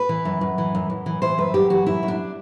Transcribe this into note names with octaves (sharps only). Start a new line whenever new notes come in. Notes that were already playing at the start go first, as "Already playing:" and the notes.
Already playing: B4
E3
F#2
F#2
E3
F#2
F#2
E3
E3 C5
F#2 B4
F#2 G4
E3 F#4
F#2 E4
F#2
D4